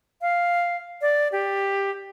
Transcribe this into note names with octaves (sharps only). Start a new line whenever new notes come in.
F5
D5
G4